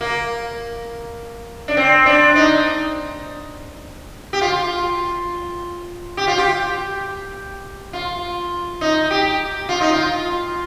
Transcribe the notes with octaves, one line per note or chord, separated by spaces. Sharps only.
A#3
D4
C4
D4
D#4
G4
F4
G4
F4
G4
F4
D#4
G4
F4
D#4
F4